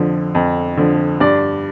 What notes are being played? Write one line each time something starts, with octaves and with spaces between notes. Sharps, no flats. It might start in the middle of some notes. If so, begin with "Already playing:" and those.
Already playing: F2 D3 F3
F2
D3 F3
G2 D5